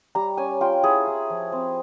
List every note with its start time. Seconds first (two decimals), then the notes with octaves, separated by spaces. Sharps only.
0.15 G3 A#5
0.37 C#4 G#5
0.61 F4 G5
0.83 E4 G#4
1.07 E4
1.30 F3
1.52 C4